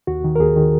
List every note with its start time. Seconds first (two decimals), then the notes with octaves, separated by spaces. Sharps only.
0.07 D#2 F#4
0.24 D#3
0.36 A#4
0.40 D#2 G#4
0.56 D#3